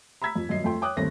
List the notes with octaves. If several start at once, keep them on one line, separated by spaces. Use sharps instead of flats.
A#5 B5 E6 G#6 B6
F2
D#1 F#2 D#5 C7
F2 A3 G5 C6
C#5 G5 D6 D#6 F#6
G1 D#2 A3 C4 A#6